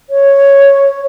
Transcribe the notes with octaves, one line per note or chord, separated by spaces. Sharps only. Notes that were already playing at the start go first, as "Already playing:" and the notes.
C#5